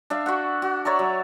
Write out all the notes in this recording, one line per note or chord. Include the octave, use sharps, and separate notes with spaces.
D4 E5 F5
F#4 E5 F#5
F#4
C#5 D5 E5 A#5
F#3